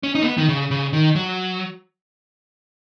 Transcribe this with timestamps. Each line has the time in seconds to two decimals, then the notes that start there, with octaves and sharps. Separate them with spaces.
0.03 C#4
0.15 D#4
0.22 A#3
0.26 B3
0.37 D#3
0.49 C#3
0.71 C#3
0.93 D#3
1.15 F#3